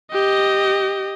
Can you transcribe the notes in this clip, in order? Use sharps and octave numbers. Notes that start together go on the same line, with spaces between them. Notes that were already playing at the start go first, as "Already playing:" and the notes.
G4 D#5